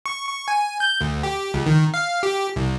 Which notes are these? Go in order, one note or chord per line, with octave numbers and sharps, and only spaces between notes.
C#6
C#6
G#5
G6
D2
G4
C#2
D#3
F5
G4
C2